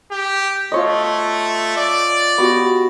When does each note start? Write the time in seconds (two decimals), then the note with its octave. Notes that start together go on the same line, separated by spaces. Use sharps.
0.11 G4
0.72 A3 F4 C#5 D#5
1.77 D5
2.38 B3 F#4 G4